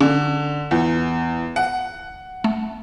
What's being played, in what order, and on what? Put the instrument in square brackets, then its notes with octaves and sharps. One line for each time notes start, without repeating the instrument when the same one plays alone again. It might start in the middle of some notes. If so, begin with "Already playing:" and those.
[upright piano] D3 [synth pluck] C#4
[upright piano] E2
F#5
[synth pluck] A3